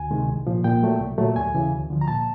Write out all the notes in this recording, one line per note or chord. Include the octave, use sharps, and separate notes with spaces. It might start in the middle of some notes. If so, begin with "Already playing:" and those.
Already playing: D2 G#5
C3 D#3 G#3
C2
A#2 F3
A#2 G5
F#3 A3
C2
A#2 F#3 A3
D#2 G#5
C#3 E3
D2
D3 F3
A#5
A#2 A5